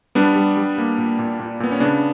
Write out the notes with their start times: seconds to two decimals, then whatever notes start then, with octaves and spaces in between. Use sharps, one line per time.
0.15 G3 B3 D4
0.36 G3
0.57 G3
0.78 A#3
0.98 A#2
1.19 A#2
1.40 A#2
1.60 A#2 B3
1.72 C#4
1.80 C#3 B3 D4